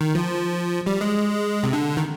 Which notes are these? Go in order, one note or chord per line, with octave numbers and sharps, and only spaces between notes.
D#3
F3
G3
G#3
C3
D3
D#3